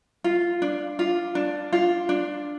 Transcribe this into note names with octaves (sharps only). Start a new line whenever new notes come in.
F4
D4
F4
D4
F4
D4